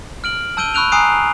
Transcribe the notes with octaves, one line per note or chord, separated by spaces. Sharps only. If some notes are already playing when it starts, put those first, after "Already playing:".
F6 D7 F#7
A5 E6 G6 D7 D#7 G7
B5 C#6 E6 F#6 D7 F7
G#5 A#5 D#6 F#6 C7 D7